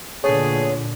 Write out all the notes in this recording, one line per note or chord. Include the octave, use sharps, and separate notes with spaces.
A#2 D3 A3 B3 G#4 C#5